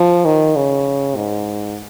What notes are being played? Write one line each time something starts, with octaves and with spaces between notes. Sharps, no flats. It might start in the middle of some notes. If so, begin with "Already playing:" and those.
Already playing: F3
D#3
C#3
G#2